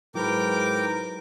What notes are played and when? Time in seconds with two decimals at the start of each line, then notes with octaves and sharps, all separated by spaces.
0.15 G#2 F#3 E4 A#4 B4 G5 B5 D6